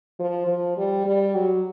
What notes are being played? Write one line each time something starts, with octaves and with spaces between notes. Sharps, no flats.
F3
F3
G3
G3
F#3